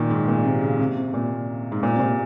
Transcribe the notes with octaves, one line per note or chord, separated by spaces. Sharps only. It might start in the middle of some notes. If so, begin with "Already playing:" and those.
Already playing: A#2 D#3
G#2
A#2
C3
C#3
C3
C3
A#2
G#2
A#2
C3
A#2